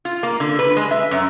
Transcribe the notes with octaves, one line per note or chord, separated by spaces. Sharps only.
F4
A#3
D3
B4
G#3
E5
F#2